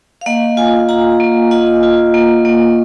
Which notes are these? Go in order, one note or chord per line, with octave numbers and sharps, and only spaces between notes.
F5
A#3 D#5 F#5
F4 F5 G#5
F4 F#5 A#5
A#3
F4 D#5 F#5
F4
A#3
A#3